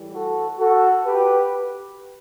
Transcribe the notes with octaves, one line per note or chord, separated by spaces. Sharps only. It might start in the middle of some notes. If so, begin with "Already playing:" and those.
Already playing: A2 E3 G3
F#4 A4
F#4 A4
G4 B4